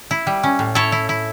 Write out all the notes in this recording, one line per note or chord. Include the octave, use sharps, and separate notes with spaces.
E4
G3
C#4
A2
E4 A4 C#5
E4
E4